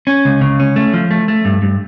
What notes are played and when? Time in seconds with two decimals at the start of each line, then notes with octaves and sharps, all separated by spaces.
0.07 C#4
0.25 C#2
0.41 C#3
0.60 C#4
0.76 A3
0.94 F3
1.11 A3
1.28 A3
1.45 G2
1.62 G2